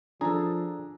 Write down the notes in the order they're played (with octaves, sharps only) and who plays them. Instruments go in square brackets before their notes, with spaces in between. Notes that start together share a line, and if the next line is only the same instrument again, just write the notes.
[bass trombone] F3 [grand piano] D4 [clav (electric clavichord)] G#4 A4 [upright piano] A#5